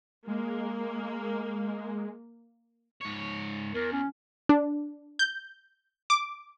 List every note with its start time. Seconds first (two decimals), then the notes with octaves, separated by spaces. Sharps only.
0.28 G#3 A#3
3.01 G#2 C#5
3.75 E2 A#4
3.92 C#4
4.49 D4
5.19 G6
6.10 D6